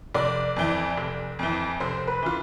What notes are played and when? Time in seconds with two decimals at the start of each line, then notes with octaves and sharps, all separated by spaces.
0.15 F1 D5
0.56 F2 E3
0.98 F1
1.39 F2 E3
1.80 F1 C5
2.07 B4
2.22 E3 F4